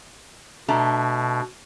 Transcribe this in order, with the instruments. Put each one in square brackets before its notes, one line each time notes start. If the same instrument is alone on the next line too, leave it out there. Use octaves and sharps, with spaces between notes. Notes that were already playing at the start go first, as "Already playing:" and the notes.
[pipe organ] B2 [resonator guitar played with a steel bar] A3 D4 A#5